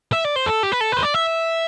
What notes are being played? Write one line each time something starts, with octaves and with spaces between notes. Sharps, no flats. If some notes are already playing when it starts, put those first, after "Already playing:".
E5
D5
C5
A4
G4
B4
A4
B4 C5
D5
E5